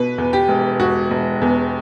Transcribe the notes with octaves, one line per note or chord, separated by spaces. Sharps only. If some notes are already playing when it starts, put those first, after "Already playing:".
Already playing: B2 B4
E2
G4
E1
E1 F#4
E1
E2